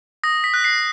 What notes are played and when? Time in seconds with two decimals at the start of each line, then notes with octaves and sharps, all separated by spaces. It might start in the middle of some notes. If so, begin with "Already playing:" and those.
0.24 D#6 A#6
0.44 B6
0.54 F#6
0.64 C7